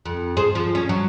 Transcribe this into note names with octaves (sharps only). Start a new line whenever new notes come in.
F2
G#4 C5
F3
C#4
F#3